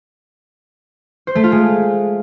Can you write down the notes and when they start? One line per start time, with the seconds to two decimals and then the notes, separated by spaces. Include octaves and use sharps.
1.27 C5
1.35 A3
1.44 F4
1.52 G#3